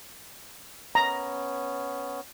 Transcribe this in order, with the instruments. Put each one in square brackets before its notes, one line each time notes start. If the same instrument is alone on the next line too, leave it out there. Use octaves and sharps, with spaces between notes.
[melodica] B3 C#4 [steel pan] A#5